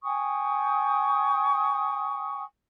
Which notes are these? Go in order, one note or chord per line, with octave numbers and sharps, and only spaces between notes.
G5 G#5 C#6 D#6